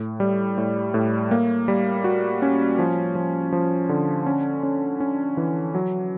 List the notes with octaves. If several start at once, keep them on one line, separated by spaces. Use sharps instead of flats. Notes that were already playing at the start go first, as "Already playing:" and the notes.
Already playing: A2
G3
A2
A2
A#3
G3
F#4
C#4
F3
F3
F3
D3
C#4
C#4
C#4
E3
F#3